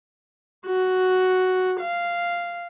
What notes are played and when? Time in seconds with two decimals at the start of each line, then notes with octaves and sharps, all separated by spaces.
0.66 F#4
1.80 F5